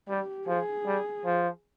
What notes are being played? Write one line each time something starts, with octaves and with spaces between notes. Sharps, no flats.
G3 G4
F3 G#4
G3
F3